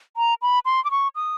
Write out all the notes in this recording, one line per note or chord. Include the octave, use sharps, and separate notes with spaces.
A#5
B5
C6
D6
C#6
D#6